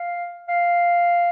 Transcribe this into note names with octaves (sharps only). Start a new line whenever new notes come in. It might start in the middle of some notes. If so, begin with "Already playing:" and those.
Already playing: F5
F5